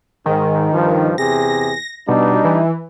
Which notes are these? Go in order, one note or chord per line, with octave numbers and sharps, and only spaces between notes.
G#2 D#3
G2 F3
E2 C3 G#4 A#6
B2 G3 D4 D#4
E3